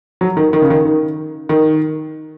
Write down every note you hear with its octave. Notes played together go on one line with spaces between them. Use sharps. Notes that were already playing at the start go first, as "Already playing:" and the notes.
F#3
D#3
D#3
C#3
D#3
D#3
D#3